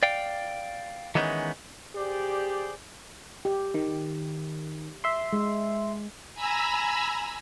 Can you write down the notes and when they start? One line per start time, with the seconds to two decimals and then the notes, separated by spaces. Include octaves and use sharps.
0.03 D5 F5 G5
1.15 D#3 E3 G#3 B3 C#4 D#4
1.95 G4 G#4 C5 D5
3.45 G4
3.74 D#3
5.04 E5 C6
5.33 G#3
6.35 G#5 A#5 B5 E6